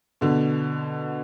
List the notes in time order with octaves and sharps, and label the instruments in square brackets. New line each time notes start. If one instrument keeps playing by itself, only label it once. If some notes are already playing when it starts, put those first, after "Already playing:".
[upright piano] B2 D3